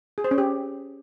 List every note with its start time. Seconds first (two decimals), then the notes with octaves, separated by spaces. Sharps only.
0.18 G#4
0.24 C5
0.31 C#4
0.38 G4